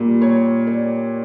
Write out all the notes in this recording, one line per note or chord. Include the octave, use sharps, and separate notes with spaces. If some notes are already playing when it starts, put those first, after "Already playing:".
Already playing: A#2 G3 A#3
C#5
D5